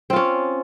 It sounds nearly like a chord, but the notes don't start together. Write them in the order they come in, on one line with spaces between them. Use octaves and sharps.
C4 F4 C#4